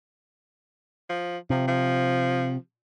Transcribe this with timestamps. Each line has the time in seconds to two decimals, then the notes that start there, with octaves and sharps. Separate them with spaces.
1.10 F3
1.50 C3 F3
1.68 F3